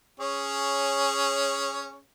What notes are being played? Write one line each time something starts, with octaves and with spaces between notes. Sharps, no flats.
C#4 G#4 C#5